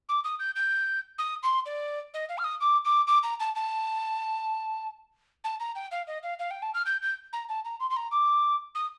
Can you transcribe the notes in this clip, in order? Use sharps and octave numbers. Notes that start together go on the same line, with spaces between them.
D6
D#6
G6
G6
D#6
C6
D5
D#5
F5
F6
D#6
D6
D6
D6
A#5
A5
A5
A5
A#5
G5
F5
D#5
F5
F5
G5
A5
F6
G6
G6
A#5
A5
A#5
C6
C6
A#5
D6
D#6